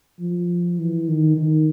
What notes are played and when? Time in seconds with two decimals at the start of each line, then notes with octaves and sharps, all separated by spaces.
0.20 F3
0.79 E3
1.08 D#3
1.37 D#3